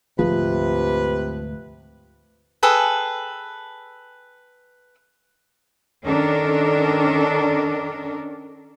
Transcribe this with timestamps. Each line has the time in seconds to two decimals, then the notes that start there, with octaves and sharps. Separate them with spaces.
0.19 D2 G#2 C3 F3 B4
2.63 G#4 A4 B4 G5
6.04 D#3 C#4 D4 A4 A#4